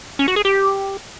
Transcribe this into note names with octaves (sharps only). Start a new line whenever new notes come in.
C#4
F#4
G#4
G4